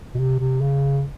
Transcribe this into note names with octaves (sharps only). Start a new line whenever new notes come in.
B2
C3
C3
C#3